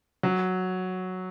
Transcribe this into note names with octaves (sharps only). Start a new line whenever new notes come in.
F#3